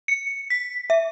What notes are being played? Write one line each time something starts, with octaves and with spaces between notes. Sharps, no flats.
C#7
B6
E5